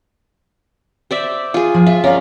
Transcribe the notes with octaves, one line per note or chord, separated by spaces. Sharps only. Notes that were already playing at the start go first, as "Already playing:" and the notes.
C5 D5 E5
F4 G#4
F3
F4 E5
C#4 A#4 D5 F5